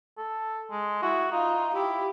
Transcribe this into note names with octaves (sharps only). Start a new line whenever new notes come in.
A4
G#3
E4 F#4
D#4 F4
E4 G4